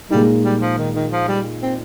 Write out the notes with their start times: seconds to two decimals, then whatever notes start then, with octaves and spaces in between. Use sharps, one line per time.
0.10 A#2 G3 G#3 D#4
0.44 G3
0.61 F3
0.78 D#3
0.95 D#3
1.12 F3
1.28 G3
1.62 C4